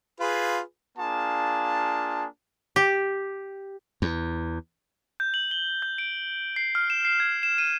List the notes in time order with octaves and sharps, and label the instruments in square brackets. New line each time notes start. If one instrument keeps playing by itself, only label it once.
[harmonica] F4 G#4 B4
[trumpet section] A#3 D4 F4 G#4 A5
[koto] G4
[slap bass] E2
[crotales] G6
F#7
G7
G6
D7
C7
F6
E7
C7
G#6
E7
D#7